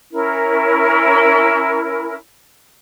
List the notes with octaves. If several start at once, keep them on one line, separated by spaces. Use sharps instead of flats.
C#4 E4 A#4